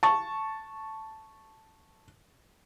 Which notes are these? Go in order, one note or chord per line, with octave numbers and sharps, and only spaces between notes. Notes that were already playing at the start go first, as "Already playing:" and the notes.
A5 C#6